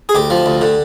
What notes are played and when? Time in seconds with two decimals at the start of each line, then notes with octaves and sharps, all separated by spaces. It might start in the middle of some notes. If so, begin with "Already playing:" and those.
0.09 G#4
0.15 D2 G4
0.30 F3
0.46 D2
0.61 D3